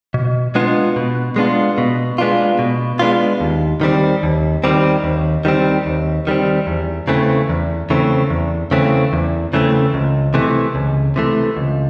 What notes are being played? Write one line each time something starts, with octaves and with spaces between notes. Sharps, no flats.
B2
G#3 B3 D4 F4
B2
G#3 B3 D4 F4
B2
G#3 B3 D4 F4
B2
G#3 B3 D4 F4
D#2
D#3 G3 C4
D#2
D#3 G3 C4
D#2
D#3 G3 C4
D#2
D#3 G3 C4
E2
C#3 E3 A3 C4
E2
C#3 E3 A3 C4
E2
C#3 E3 A3 C4
E2
C#3 E3 A3 C4
C#2
C3 E3 A3
C#2
C3 E3 A3
C#2